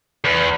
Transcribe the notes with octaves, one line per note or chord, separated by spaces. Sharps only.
E2